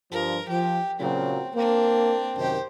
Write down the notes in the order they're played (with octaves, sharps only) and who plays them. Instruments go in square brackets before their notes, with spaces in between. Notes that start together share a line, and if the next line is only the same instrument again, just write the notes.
[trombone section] G2 F3 [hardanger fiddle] A#4
[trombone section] F3 [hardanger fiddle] G4
[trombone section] A#2 C#3 F#3 [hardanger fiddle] C4
[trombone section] A#3 [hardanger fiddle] C4 D4
[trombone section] F#2 C3 D#3 [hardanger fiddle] G4 C5